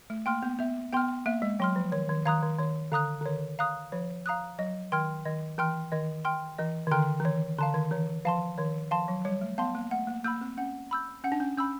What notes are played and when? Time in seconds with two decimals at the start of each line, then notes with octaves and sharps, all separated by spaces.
0.10 A3
0.26 A#3 G5 C6 F6
0.43 B3
0.59 B3 E5
0.93 B3 G5 C6 F6
1.26 A#3 E5
1.42 G#3
1.59 F#3 G5 C6 F6
1.76 F3
1.92 D#3 C#5
2.09 D#3
2.25 D#3 F5 A#5 D#6 F#6
2.43 D#3
2.59 D#3 C#5
2.92 D3 F5 A#5 D#6 F#6
3.21 D3
3.26 D#3 C#5
3.59 F5 A#5 D#6 F#6
3.92 F3 C#5
4.26 F5 A#5 D#6 F#6
4.59 F#3 D#5
4.92 D#3 G5 C6 F6
5.25 D#3 D#5
5.58 E3 G5 C6 F6
5.92 D#3 D#5
6.25 G5 C6 F6
6.58 E3 D#5
6.87 D#3
6.91 D3 G5 C6 F6
7.20 E3
7.25 D#3 C#5
7.58 D3 F5 A5 C6
7.74 D#3
7.91 E3 C#5
8.25 F3 F5 A5 C6
8.58 D#3 C#5
8.91 F3 F5 A5 C6
9.08 F#3
9.25 G3 C#5
9.41 A3
9.58 B3 F5 A5 C6
9.75 A#3
9.91 A3 F#5
10.07 A#3
10.24 A#3 B5 E6 G6
10.41 C4
10.57 C#4 F#5
10.91 B5 E6 G6
11.24 C#4 F#5
11.32 D4
11.40 C#4
11.58 C#4 B5 E6 G6